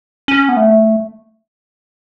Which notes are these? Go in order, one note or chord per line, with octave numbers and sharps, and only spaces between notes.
C#4
B3
A3